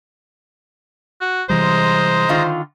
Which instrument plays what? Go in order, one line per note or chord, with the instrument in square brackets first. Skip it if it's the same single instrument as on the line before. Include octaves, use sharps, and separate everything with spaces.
[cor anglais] F#4
[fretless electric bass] C3 E3 G3 [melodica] G#3 A#5 D#6 [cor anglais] C5
[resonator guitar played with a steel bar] D3 D#3 F4